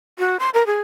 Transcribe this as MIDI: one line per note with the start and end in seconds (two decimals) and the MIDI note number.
0.19 0.37 66
0.39 0.50 84
0.54 0.66 70
0.66 0.81 68